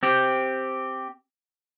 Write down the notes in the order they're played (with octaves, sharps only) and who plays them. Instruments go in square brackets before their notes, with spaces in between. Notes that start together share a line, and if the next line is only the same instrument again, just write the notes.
[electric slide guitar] C4 G4